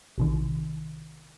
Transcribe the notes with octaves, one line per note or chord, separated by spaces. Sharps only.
A#1 C3 D#3